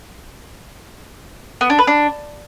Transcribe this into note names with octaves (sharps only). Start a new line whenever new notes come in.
B3
D4
B4
D4